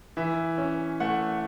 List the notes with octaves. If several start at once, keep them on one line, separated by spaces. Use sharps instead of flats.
E3 E5
C#4
A3 F#5